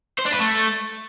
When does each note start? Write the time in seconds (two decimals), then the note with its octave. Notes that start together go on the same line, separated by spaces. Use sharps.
0.19 C5
0.26 D4
0.32 B4
0.39 A3